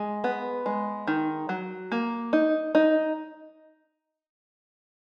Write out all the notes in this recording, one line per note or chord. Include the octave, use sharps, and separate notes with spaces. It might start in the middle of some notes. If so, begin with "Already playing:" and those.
Already playing: G#3
B3
G#3
D#3
F#3
A#3
D#4
D#4